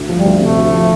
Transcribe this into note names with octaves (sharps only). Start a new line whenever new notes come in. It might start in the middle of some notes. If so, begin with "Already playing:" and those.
Already playing: D2
F3
G3
D2
C3 A3
D2
F3